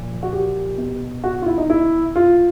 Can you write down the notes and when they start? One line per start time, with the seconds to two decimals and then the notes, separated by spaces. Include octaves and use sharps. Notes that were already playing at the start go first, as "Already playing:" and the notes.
Already playing: A#2 F3
0.23 F#4
0.33 G4
0.78 B2
1.24 F#4
1.42 F4
1.46 E4
1.58 D#4
1.70 E4
2.16 F4